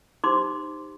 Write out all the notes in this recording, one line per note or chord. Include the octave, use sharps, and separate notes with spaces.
D#4 G4 C5 C6 D6